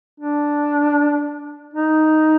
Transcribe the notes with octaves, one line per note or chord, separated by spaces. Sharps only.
D4
D#4